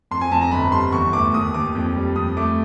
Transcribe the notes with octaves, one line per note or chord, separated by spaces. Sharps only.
F2 C6
G#5
F2 A5
A#5
G1 B5
G3 C6
E2 C#6
A3 D6
D#2 D#6
D#2 D6
F2
G3
F2 D#6
A3 D6